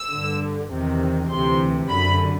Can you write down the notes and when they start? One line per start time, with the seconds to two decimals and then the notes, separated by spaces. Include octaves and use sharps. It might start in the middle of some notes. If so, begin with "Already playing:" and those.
Already playing: E6
0.11 G2 D3
0.70 E2 C3 D#3
1.29 D2 C3 E3 C6
1.89 F#2 D3 B5